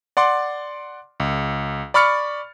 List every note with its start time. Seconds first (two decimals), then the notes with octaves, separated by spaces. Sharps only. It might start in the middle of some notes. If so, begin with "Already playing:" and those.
0.17 D5 F#5 C6 D6
1.20 C#2
1.94 D5 B5 C#6 F6 A6 C#7